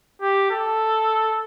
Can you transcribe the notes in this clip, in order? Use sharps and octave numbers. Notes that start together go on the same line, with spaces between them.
G4
A4